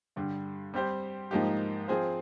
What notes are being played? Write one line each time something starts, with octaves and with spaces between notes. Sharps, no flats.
G2 D3 G3
G3 C4 G4 C5
G#2 F3 A#3 D#4 G4
F3 C4 F4 G#4 C5